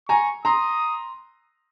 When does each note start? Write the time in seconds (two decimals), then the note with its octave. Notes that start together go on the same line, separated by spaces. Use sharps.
0.09 G#5 A#5 C#6
0.45 A#5 C6 D#6